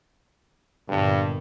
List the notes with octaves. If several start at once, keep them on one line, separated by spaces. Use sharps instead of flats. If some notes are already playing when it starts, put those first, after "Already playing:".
G1 G2 A#2